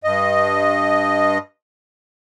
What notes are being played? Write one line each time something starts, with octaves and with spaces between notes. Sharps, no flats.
G2 D#5